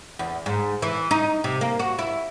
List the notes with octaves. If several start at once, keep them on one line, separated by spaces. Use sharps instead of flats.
E2
G#2
E3
D#4
C3
A#3
F#4
E4